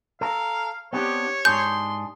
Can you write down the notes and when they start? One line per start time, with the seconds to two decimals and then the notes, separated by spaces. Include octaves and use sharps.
0.21 A4 F5 A#5
0.93 B3 C4 D4 G4 C#5
1.45 G#2 D4 G#4 C6 G6